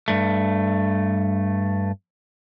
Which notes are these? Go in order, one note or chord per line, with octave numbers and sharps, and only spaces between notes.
G2 A3